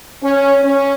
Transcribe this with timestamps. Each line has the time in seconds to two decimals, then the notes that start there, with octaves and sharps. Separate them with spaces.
0.24 C#4
0.63 C#4